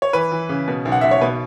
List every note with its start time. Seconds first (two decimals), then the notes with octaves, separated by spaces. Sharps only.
0.02 C#5
0.13 E3 B4
0.32 E3
0.49 C#3
0.68 B2
0.85 B1
0.92 F#5
1.01 B1 E5
1.11 C#5
1.21 B2 B4